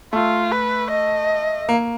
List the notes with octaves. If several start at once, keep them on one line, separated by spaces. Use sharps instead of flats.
A3 F4
B4
D#5
A#3